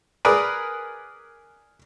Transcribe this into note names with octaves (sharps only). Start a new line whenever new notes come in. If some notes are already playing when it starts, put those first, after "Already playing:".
G#4 A#4 B4 D5